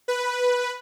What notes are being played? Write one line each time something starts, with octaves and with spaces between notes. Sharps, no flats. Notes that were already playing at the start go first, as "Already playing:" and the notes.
B4